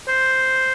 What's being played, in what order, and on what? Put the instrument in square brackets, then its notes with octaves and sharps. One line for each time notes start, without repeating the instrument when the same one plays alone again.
[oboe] C5